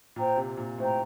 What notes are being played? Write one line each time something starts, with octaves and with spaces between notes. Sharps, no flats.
A#2 C5 G5 A#5
C3
A#2
A2 C5 G5 A#5